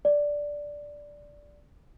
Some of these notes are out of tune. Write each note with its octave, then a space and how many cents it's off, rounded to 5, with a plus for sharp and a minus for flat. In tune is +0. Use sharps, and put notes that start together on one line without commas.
D5 -5